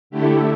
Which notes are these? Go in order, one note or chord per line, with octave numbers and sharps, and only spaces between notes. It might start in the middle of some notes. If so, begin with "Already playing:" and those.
D3 A3 E4 G4